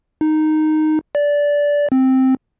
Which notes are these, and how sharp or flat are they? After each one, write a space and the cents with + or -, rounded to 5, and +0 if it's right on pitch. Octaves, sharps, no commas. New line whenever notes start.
D#4 -5
D5 -15
C4 +0